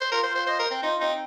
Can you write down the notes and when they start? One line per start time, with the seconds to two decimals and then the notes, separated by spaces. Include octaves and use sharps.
0.01 C5
0.12 F4 A#4
0.23 C5
0.30 F4
0.35 C5
0.47 C5 D#5
0.59 A#4
0.66 C5
0.71 C4
0.82 D#4 F4
1.01 C4 D#4